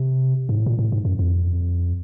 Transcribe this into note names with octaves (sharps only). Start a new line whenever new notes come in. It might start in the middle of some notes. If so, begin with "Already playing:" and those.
Already playing: C3
G#2
A2
A#2
A2
G#2
F#2
F2